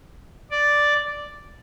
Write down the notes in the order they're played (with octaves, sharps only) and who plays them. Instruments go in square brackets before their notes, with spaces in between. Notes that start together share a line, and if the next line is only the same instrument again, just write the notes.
[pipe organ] D5